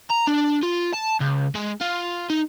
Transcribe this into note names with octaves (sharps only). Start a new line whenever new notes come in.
A#5
D4
F4
A5
C#2
G#3
F4
D#4